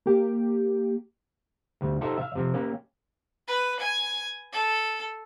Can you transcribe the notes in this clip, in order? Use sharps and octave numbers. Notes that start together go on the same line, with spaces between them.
A#3 G4
D2 G3
D#4 F4 G4 A4 C5 E5
E5 F5
C3 F3 C4
A#3 C#4 G4
B4
G#5
A4